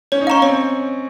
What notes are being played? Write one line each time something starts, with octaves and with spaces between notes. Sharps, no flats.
C#4 C#5
D#4
C#4 F5 A#5 C#6
C4 C#5